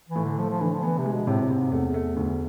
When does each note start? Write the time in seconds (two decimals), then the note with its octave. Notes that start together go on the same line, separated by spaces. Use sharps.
0.09 E3
0.16 A2
0.23 D3
0.38 F3 A3
0.50 F3
0.61 D3 E3
0.72 F3
0.83 E3 B3
0.98 C3
1.06 G#3
1.12 B2
1.27 A2 C3
1.42 A2
1.50 C3
1.57 G#2
1.71 E2 A3
1.94 A3
2.16 D2